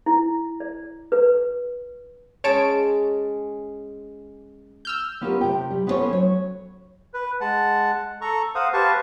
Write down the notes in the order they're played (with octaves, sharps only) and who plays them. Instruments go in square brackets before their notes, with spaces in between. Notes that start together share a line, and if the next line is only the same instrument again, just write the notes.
[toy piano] E4
D5
B4
[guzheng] G#3 C#4 G#4 [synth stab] C#5 A5 D7
[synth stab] E6 F6 G6
[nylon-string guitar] B3 C#4 F4 G4 A#4
C3 G5
G3
B3 C#4 E4 A4 C5 C#5
F#3 C#5
[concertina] B4
G#3 F#5 A5
A4 A#5 C#6
C5 F5 F#5 D#6
G4 B4 C5 F5 A5 C#6